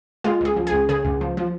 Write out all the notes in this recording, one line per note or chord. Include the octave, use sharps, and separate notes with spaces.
G#3 F4
C#2 G#4
F3
G#4
C#2
C#3 G#4
C#2
F3
F3